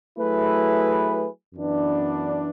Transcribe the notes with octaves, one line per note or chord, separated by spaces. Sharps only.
F#3 A3 E4 G#4 B4
F#2 E3 B3 D4